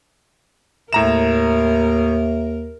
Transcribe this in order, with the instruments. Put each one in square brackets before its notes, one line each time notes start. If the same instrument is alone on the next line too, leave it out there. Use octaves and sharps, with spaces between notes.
[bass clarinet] D#2 [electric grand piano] A2 A#5 E7 [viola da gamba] A#4 [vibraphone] E5